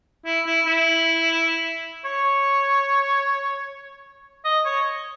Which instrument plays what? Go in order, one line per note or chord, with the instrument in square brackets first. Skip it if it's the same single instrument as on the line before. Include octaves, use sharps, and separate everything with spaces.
[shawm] E4
E4
E4
C#5
D#5
C#5